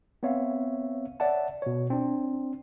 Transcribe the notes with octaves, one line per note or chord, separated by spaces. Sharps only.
B3 C4 C#5 E5 F5
C#5 D5 E5 F#5 A5
B2 C#5
C4 D4